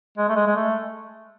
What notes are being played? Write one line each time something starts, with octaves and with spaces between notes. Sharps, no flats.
G#3
A3
G#3
G#3
A3